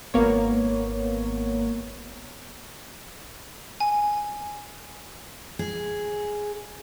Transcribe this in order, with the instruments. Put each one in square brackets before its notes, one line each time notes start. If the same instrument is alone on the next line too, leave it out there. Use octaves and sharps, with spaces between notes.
[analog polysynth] G#1 A#3 B3 C#5
[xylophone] G#5
[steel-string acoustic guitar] G#4